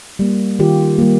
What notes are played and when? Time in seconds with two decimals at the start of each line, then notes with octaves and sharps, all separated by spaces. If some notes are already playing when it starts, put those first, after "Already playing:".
0.19 G3 A#3
0.59 D#3 F4 G4
0.98 G3 A#3